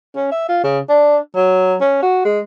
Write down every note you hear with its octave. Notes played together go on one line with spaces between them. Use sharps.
C#4
E5
F4
C#3
D4
F#3
C#4
F#4
G#3